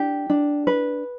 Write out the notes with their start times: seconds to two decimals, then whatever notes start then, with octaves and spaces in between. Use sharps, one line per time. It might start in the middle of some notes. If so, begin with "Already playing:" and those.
Already playing: D4 G4
0.30 D4
0.67 B4